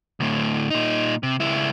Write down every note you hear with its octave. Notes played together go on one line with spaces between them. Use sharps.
D2 A2
A#2 D#4
C3
C#2 E4